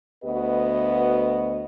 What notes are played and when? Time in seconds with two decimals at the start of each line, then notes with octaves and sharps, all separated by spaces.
0.24 D2 B3 F#4 B4 D#5